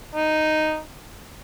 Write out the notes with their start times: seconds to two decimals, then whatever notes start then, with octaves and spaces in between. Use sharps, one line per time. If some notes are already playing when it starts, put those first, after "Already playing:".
0.15 D#4